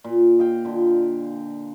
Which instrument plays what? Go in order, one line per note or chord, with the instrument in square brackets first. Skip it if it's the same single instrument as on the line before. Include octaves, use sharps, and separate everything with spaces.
[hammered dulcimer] A#2
D#5 F5 G5
A#2 D3